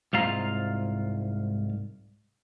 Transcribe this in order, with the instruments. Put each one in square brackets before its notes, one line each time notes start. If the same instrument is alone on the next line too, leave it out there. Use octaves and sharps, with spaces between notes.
[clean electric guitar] C2 G#2 F4 F5 A#5